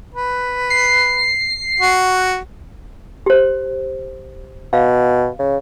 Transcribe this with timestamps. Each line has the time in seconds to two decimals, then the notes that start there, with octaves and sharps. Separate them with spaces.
0.14 B4
0.70 C7
1.80 F#4
3.26 G4 C5
4.73 B2 F5
5.39 C#3